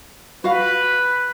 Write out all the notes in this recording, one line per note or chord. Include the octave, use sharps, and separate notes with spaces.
F#4 B4 F5